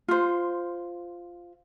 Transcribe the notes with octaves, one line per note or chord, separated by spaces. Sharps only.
F4 C5